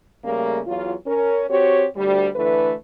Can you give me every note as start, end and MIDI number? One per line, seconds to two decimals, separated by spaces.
0.25 0.59 49
0.25 0.59 55
0.25 0.59 57
0.25 0.59 58
0.67 0.92 40
0.67 0.92 54
0.67 0.92 65
1.07 1.45 61
1.07 1.45 70
1.50 1.86 60
1.50 1.86 66
1.50 1.86 67
1.50 1.86 73
1.96 2.28 38
1.96 2.28 55
2.36 2.73 50
2.36 2.73 52
2.36 2.73 57
2.36 2.73 71